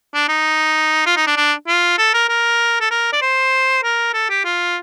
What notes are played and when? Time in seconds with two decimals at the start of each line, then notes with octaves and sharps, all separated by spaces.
0.14 D4
0.29 D#4
1.06 F4
1.16 D#4
1.27 D4
1.37 D4
1.68 F4
1.98 A4
2.14 A#4
2.29 A#4
2.81 A4
2.91 A#4
3.13 D5
3.21 C5
3.83 A#4
4.14 A4
4.30 G4
4.45 F4